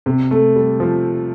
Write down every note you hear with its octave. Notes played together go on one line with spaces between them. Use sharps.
C3
A3
G3
F3